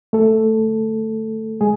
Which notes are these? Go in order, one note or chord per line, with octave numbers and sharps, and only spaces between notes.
A3 A4
G#3 G#4